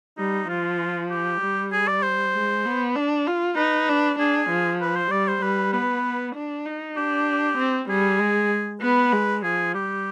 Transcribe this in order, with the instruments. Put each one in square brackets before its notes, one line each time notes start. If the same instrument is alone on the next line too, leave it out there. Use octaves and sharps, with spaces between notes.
[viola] G3 [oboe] D#4
[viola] F3 [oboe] F4
[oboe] G4
[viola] G3
[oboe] G#4
D5
C5
[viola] G#3
B3
D4
F4
[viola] D#4 [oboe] B4
[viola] D4
[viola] D4 [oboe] G#4
[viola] F3
[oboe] B4
C5
[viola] G3 [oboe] D5
[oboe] C5
[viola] G3 [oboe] B4
[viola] B3 [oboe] B4
[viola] D4
D#4
[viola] D4 [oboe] G4
[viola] C4
[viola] G3 [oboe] G#4
[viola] G#3
[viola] B3 [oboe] B4
[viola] G#3
[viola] F3 [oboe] G#4
[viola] G3 [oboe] G4